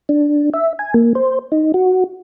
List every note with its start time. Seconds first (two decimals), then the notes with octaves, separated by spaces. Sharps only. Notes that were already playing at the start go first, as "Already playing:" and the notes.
0.09 D4
0.54 E5
0.79 G#5
0.94 A#3
1.15 C5
1.52 D#4
1.74 F#4